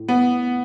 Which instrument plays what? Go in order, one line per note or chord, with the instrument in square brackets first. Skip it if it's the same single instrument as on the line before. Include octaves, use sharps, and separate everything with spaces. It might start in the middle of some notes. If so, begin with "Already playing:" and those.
Already playing: [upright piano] A2
[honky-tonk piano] B3